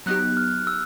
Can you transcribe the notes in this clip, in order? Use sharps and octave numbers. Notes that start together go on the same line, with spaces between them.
F#3 B3 D#4 G4 F#6
F6
E6